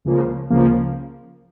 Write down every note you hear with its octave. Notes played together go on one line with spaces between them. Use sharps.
C#2 C#3 F3 A#3
C#2 C#3 F3 A#3